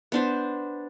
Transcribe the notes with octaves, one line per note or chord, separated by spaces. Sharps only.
B3 D4 C5